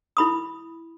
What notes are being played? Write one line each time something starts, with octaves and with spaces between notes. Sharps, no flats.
E4 B5 D#6